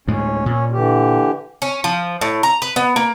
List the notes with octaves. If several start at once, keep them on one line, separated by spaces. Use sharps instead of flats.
D2 A2 G#3 C#4
A#2 C#4
D3 E3 G4
C#4
F3
A2
A#5
B4
B3
A#3